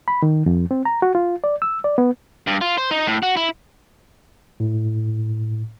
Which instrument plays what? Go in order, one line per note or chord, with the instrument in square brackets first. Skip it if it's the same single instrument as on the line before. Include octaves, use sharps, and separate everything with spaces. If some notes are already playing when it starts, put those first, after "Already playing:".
[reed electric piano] B5
D#3
F2
C4
A#5
F#4
F4
D5
E6
D5
B3
[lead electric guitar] G2
F4
C5
D#4
A2
F#4
E4
[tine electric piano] A2